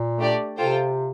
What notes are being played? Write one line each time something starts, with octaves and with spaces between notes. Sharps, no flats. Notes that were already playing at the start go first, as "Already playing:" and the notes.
Already playing: A#2
A3 D4 G4 D5
C3 F4 A4 C5 G5